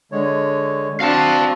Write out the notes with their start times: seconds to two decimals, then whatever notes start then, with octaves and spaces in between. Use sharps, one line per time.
0.12 D3 G#3 C#5
1.00 C4 D4 F#4 F5 A5